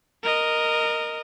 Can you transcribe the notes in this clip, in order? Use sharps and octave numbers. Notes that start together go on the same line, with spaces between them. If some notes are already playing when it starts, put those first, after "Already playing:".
A#4 D#5